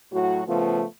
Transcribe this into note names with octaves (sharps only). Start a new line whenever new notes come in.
A2 F#3 F#4
C#3 F3 A3 B3 F4